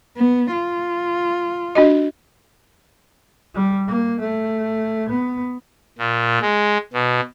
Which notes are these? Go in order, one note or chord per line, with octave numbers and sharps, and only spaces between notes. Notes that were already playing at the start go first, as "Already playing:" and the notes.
B3
F4
D4 F#4 D#5
G3
A#3
A3
B3
A#2
G#3
B2